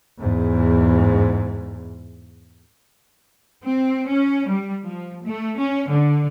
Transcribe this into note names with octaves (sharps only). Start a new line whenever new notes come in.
E2 G#2
C4
C#4
G3
F3
A3
C#4
D3